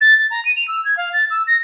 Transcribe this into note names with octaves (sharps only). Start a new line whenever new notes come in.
A6
A6
A#5
D#7
F7
E6
G#6
F5
A6
E6
A#6